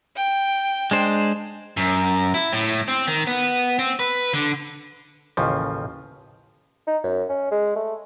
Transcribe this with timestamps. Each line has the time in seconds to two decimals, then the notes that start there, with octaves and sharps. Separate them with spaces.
0.16 G5
0.91 G#3 D4 C5
1.77 F#2
2.34 E4
2.53 A2
2.88 C4
3.07 D#3
3.27 B3
3.79 C4
3.99 B4
4.34 D3
5.37 A1 D#2 C#3 F3
6.87 D#4
7.04 F#2
7.29 C#4
7.51 G#3
7.76 A3